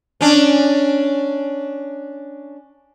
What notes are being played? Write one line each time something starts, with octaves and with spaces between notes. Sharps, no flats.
C#4 D4